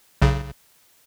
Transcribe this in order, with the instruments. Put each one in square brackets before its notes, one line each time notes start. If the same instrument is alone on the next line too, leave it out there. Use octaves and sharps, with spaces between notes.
[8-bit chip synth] B1 C#3